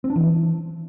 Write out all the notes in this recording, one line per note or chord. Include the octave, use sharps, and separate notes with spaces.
C4
D4
E3